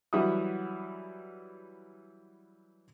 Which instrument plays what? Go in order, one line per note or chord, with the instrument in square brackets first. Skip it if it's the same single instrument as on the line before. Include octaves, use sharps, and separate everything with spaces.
[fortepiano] E3 F#3 G3 E5 F#5 D#6